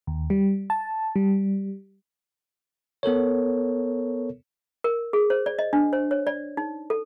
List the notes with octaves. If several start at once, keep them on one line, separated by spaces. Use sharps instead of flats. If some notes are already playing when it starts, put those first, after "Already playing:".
D#2
G3
A5
G3
B3 A4 A#4 C#5
A#4
G#4
C5
D5
D#5
D4
C5
C#5
D5
D#4
A4